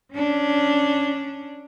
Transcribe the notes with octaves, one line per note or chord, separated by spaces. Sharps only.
C#4 D4